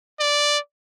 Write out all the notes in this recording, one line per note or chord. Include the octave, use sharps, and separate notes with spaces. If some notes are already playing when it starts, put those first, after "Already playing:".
D5